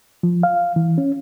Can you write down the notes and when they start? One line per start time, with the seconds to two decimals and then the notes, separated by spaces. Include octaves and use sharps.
0.23 F3
0.43 F5
0.76 E3
0.98 C#4